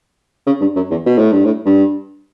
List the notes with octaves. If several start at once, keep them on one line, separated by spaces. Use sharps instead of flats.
C#3
G2
F#2
E2
B2
A2
G2
A2
G2